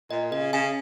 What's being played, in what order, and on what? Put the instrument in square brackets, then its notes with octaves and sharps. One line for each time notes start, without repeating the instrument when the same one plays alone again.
[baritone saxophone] A#2 [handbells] D#5
[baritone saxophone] C#3 [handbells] D#5
[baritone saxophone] C#3 [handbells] G#5